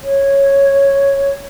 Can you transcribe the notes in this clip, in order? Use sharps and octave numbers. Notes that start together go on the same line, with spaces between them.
C#5